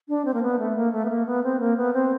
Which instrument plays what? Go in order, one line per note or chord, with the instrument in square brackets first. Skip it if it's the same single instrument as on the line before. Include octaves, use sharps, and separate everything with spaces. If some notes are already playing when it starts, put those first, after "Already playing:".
[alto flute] D4
C4
A#3
B3
A3
A#3
A3
B3
A#3
B3
C4
A#3
B3
C4